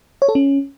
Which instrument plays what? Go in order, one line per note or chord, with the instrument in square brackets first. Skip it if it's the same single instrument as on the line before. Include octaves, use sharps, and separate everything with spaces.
[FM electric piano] C#5
A4
C#4